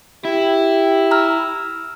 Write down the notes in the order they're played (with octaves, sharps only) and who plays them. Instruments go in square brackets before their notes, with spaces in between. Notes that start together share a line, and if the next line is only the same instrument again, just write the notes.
[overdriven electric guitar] E4 [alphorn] G4
[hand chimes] A#5 E6 F6